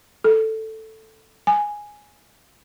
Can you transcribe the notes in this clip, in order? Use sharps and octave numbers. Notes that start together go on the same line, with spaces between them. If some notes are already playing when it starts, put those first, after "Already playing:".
A4
G#5